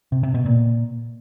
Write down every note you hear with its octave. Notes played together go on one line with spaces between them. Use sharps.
C3
C3
B2
A#2